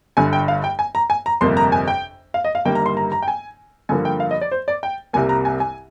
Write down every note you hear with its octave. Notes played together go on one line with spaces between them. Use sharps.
G1 G2 D3 G#5
G5
F5
G5
G#5
A#5
G#5
A#5
G1 F2 C3 G3 A#3 C6
A#5
G#5
G5
F5
D#5
F5
G1 G2 D#3 G3 A#3 G5
A#5
C6
A#5
A#5
G5
G#5
G2 D3 F3 A#3 G#5
G5
F5
D#5
D5
C5
D5
G5
C2 C3 G3 A#3 G#5
A#5
G#5
G#5